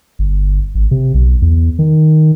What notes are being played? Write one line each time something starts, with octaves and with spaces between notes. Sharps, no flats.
G1
G#1
C3
B1
E2
D#3